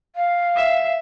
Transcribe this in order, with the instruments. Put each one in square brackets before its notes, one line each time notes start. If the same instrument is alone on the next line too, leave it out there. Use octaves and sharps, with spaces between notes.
[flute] F5
[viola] E5